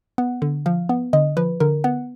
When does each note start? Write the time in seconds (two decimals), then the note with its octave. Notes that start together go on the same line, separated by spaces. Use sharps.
0.18 B3 F#5
0.42 D3
0.66 F3 F5
0.89 B3
1.13 D3 D#5
1.37 F3 B4
1.60 D3 A#4
1.84 B3 F#5